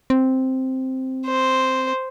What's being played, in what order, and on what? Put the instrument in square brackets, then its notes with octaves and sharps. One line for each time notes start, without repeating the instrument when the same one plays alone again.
[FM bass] C4
[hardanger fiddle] C5